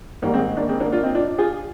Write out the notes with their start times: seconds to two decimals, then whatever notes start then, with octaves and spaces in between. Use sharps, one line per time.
0.22 G#1 G#2 D#3 G3 A#3
0.34 G#3 C4
0.57 A#3 D4
0.69 G#3 C4
0.80 A#3 D4
0.92 D4 F4
1.03 C4 D#4
1.15 D4 F4
1.38 F4 G#4